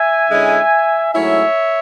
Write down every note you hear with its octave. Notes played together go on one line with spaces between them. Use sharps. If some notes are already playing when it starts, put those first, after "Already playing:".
Already playing: E5 G#5
D3 G#3 C#4 E4
G#2 F#3 A3 C#4 E4 C#5 E5